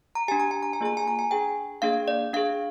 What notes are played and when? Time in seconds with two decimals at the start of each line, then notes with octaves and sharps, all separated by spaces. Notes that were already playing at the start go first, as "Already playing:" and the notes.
0.15 A#5
0.28 D4 G4 G#5
0.40 A#5
0.51 G#5
0.63 A#5
0.73 G#5
0.81 A#3 F4 G#4 A#5
0.97 G#5
1.08 A#5
1.19 G#5
1.31 D4 G#4 G5
1.82 A#3 D4 G#4 F5
2.08 D5
2.33 D4 G#4 F5